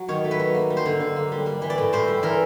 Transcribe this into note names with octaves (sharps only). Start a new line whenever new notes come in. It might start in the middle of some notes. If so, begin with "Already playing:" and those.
Already playing: F#3
D#3 C#5
A3
B4
F#3
A#3
G3
C5
D3
D3
A#3
G3
G3
E3
D5
A2
A2 C5
G3
E3 A#4